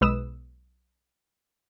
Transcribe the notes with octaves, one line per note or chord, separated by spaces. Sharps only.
B1 G#3 B4 D#6 E6 E7